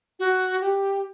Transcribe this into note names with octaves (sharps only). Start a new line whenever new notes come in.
F#4
G4